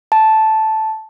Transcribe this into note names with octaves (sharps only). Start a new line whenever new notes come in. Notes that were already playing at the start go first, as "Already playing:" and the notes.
A5